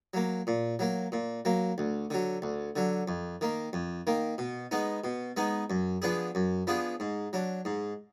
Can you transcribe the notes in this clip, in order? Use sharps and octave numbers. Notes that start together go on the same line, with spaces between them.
F#3 A#3
A#2
F#3 A#3
A#2
F#3 A#3
D2
D3 F#3
D2
D3 F#3
F2
D#3 A#3
F2
D#3 A#3
B2
G#3 B3 D#4
B2
G#3 B3 D#4
F#2
F3 B3 D4 G#4
F#2
F3 B3 D4 G#4
G#2
F#3 D4
G#2